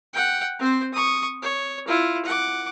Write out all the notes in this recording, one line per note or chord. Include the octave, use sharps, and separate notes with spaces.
F#5 G5
C4 C5
C#6 D#6
C#5
E4 F4
F#5 D6